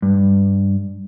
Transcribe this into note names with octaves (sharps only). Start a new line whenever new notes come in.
G2